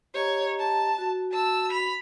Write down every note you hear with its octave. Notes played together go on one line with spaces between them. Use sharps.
G4 C#5 D#5 A#5
A5
F#4
A5 E6
B5 F7